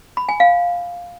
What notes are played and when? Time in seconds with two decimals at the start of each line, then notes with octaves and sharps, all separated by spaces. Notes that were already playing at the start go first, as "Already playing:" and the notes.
0.17 B5
0.29 G#5
0.40 F5